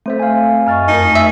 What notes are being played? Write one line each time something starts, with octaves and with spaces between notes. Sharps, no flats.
A3 C4 A4 C5 E5
F5 G#5
F#2 D#5 G#5 C#6 F6 A6
F2 A3 D#4 A#4
G#4 E5